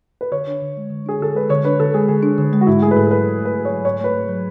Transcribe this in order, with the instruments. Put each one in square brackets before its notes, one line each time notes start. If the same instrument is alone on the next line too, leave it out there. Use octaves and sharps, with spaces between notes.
[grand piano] B4
[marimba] D3 [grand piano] C#5
[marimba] D4
D3
G#3
D3
[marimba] D4 [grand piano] G#4
[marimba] D3 [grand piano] A4
[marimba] G#3 [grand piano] B4
[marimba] D3 [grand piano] C#5
[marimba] D4 [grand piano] B4
[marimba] D3 [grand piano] A4
[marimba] G#3 [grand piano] G#4
[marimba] D3 [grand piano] G#4
[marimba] D4
D3
G#3
[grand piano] F#4
[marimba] G#2 [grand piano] E4
[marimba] A3 [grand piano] G#4
[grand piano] B4
[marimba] G#2 [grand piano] A4
[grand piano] A4
[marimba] F#3 [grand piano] B4
[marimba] G#2
[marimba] A3 [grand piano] B4
[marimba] G#2
[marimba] F#3 [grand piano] C#5
[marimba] G#2 [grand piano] C#5
[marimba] A3 [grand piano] B4
[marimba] G#2
F#3